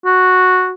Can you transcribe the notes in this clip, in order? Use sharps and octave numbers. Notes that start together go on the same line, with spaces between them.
F#4